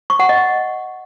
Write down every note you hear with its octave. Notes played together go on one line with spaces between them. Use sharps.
C#6
F#5
D#5